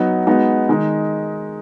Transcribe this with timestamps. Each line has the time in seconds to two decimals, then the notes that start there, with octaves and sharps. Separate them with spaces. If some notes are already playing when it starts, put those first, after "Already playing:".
Already playing: F#3 B3 D#4 F#4
0.27 G#3 B3 D#4 F#4
0.69 D#3 G#3 D#4